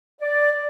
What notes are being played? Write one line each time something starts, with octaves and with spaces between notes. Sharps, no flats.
D5